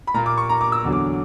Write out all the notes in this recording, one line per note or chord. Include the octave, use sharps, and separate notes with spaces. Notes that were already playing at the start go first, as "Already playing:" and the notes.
B5
A#2 A#3 A#5
D6
C#6
A#5
D6
E6
E2 D3 F#3
D6